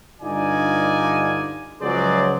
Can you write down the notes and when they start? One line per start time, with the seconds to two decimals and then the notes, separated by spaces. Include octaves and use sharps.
0.21 G2 D3 D#4 F4 D5 G#5
1.81 C#2 F3 F#3 G#4 C5 D5